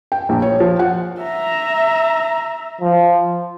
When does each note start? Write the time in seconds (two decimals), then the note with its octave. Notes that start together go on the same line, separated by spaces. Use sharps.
0.12 G5
0.29 A#1
0.42 C#5
0.60 F3
0.79 F#5
1.21 E5 A#5
2.81 F3